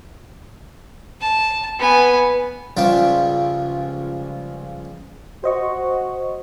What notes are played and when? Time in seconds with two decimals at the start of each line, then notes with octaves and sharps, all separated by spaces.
1.21 A5
1.79 B3 G#5
2.77 C#2 F3 G3 F4 E5 G5
5.44 F#4 C5 D#5 C#6